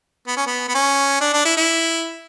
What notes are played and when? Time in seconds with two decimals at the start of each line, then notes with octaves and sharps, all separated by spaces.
0.27 B3
0.37 C#4
0.47 B3
0.69 B3
0.75 C#4
1.21 D4
1.33 D4
1.45 E4
1.57 E4